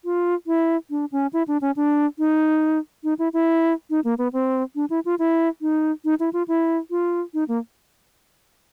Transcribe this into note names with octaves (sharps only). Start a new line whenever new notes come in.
F4
E4
D4
C#4
E4
D4
C#4
D4
D#4
D#4
E4
E4
D#4
A#3
B3
C4
D4
E4
F4
E4
D#4
D#4
E4
F4
E4
F4
D#4
A#3